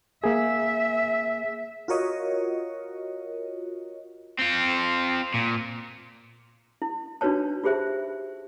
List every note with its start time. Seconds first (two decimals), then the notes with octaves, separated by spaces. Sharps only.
0.24 A#3 G#4 E5
1.88 F4 F#4 A#4 C#5 D#5
4.39 C4 F4
5.34 A#2
6.82 E4
7.21 D4 D#4 F#4 B4 C#5 A5
7.64 F4 G4 G#4 C5 E5 G5